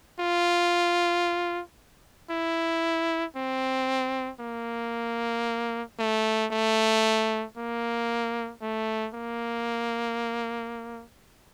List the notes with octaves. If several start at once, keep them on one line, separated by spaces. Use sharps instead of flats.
F4
E4
C4
A#3
A3
A3
A#3
A3
A#3